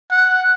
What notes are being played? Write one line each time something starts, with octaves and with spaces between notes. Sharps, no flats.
F#5